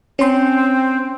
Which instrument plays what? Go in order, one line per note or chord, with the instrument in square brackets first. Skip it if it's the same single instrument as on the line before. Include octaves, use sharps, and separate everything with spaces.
[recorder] C4 [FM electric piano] C#4 C6